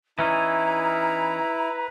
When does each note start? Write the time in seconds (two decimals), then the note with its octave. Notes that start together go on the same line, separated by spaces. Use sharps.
0.19 E3 C#4 D#4 E4 B4 A#5